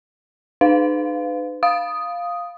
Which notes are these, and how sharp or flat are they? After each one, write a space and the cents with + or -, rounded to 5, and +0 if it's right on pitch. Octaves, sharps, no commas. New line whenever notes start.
D#4 -45 B4 +40 F5 +0
F5 +0 D#6 +0